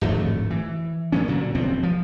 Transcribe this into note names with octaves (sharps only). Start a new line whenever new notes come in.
D1 G#1 F2 A3
E3
A#2 F3 C#4
A#2 D3 F#3
E1 B1 F3 C4
F3